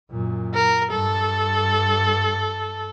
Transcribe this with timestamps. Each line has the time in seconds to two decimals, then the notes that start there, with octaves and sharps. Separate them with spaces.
0.11 F#2 A#2
0.54 A#4
0.91 G2 A4